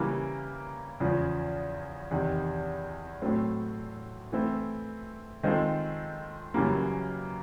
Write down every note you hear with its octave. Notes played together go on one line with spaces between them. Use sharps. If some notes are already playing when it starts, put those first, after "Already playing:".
Already playing: C#3 E3 G3 A#3
E2 C#3 F3
E2 C3 D#3
A2 F#3 A3 C4
E3 A3 C4 E4
D#3 G#3 C4 F4 A4
F#2 C#3 E3 G3 A#3